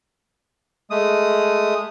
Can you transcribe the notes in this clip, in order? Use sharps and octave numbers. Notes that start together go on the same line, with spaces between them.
G#3 A3 D#6